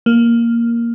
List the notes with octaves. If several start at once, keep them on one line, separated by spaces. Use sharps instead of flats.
A#3